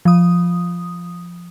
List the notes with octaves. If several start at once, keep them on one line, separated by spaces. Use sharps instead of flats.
F3 D#6